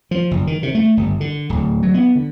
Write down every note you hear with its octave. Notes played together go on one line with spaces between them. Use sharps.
F3
F#1
D#3
C3
A3
G1
D3
D1
F#3
B3
D3